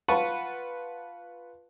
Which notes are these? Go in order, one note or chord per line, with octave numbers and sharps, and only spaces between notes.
F4 B4 F#5 A5 C#6